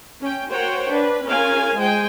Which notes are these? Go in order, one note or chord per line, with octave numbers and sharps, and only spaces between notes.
C#4 G5
F#4 A#4 C5 C#5 F#5 G5
D4 B4
C#4 F4 G#4 A#4 F5 G#5
G#3 C5 G5 G#5